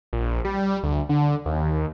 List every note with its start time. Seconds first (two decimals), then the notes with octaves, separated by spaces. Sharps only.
0.13 A#1
0.45 G3
0.83 D2
1.09 D3
1.46 D#2